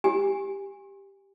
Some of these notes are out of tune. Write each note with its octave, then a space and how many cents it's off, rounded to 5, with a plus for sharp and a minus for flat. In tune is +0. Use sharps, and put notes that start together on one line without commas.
G4 +0 G#5 -25